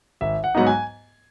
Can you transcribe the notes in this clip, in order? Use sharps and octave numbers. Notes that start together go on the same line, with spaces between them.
G#1 E5
F#5
G#2 F#3 B3 D#4 F#5
G#5